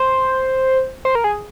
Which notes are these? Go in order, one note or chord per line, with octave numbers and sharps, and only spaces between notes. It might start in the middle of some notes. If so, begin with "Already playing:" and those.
Already playing: C5
C5
A#4
G#4